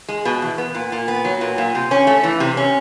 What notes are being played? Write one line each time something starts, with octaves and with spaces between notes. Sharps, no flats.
G#3
B2
E2
B3
A#2
A#2
B3
F#3
A#2
A#2
C3
C#4
A3
E3
C3
C#4